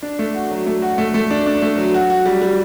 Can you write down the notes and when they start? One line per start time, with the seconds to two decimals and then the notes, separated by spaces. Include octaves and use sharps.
0.02 D4
0.19 A3
0.35 F#4
0.51 F#3
0.67 A3
0.82 F#4
0.98 A3
1.14 A3
1.31 D4
1.46 D4
1.62 A3
1.78 F#3
1.94 F#4
2.10 F#4
2.26 G3
2.42 G3